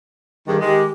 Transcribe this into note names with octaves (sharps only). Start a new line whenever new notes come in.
G2 D#3 G#4
D#3 G#3 G4